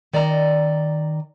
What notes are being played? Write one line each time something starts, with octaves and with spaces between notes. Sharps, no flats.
D#3 D5 D#5 A#5